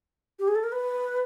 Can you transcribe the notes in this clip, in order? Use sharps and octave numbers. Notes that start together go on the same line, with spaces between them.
G4
G#4
A4
A#4
B4